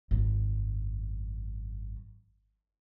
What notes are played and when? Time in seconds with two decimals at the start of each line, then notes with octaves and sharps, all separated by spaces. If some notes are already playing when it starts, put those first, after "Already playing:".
0.11 G#1 F#2